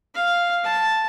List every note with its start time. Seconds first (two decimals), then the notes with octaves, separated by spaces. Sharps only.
0.15 F5
0.64 A5